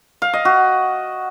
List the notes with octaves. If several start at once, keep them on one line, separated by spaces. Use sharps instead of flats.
F5
D#5
F#4